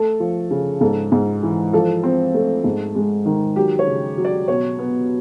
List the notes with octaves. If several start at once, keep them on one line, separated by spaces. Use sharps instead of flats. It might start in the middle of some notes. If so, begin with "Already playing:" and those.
Already playing: A3 A4
F3
C#3
G#2 A4
G#2
E3
F3 A4
C4
A3
G#2
G#3
D#3
F#3 G4
C#5
C#3
F#3
D5
B2 C#5
B3